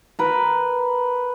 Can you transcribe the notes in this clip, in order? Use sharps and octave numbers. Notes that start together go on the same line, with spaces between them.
A#4 B4